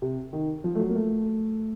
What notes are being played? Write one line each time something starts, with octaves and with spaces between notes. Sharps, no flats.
C3
D#3
F3
A3
F#3
A#3
A3